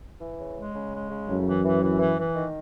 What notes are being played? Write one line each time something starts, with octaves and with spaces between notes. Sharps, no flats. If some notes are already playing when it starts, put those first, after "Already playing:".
E3
C#3
G#3
C#3
G#3
C#3
F#2 A2
E3
E3
E3
E3
E3
D#3